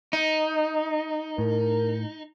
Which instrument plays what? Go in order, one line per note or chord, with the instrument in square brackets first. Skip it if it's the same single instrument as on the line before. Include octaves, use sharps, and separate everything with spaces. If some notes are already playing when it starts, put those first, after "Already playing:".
[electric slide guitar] D#4
[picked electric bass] A2 [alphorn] A#4